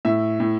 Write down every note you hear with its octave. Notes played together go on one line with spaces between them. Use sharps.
A2 E5
A2